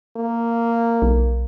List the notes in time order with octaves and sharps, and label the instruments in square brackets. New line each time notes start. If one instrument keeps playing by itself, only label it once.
[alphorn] A#3
[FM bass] B1